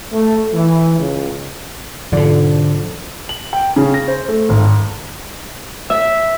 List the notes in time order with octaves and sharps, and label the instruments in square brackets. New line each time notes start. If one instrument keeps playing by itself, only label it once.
[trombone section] A3
E3
C#2
[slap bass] G#2 B2 [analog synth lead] D3 [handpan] F3
[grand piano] F#7
G5
C#3
A#6
C5
A3
G#1
[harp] E5